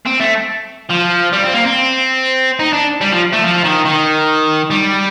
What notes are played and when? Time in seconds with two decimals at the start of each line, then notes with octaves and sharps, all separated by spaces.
0.06 C4
0.20 A3
0.90 F3
1.33 G3
1.43 C4
1.54 A#3
1.65 C4
2.59 D#4
2.73 D4
3.01 G3
3.12 F3
3.33 A3
3.44 F3
3.65 D#3
3.86 D#3
4.70 G3